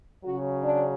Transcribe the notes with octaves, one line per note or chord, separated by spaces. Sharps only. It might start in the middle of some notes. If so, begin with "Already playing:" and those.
C#3 F#3 F#4
D4